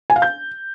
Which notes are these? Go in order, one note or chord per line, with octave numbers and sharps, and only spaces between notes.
G#5
F5
G6